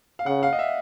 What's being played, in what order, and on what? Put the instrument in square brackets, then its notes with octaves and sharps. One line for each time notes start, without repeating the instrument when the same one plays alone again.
[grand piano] F5
[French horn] C#3 [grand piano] F#5
[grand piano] F5
D#5
E5